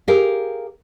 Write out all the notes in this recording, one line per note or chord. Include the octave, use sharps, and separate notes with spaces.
G4 G#4 A#4 F5